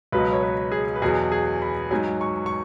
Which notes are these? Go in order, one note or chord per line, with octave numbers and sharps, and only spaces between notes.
C#2 B2 F#3 B4
C#5
B4
G#4
B4
E2 B2 F#3 G#4
G#4
B5
G#2 F#3 G#5
C#6
C#6